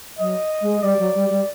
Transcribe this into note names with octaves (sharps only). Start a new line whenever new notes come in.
F#3 D#5
G#3
G3 D5
F#3
G3
G3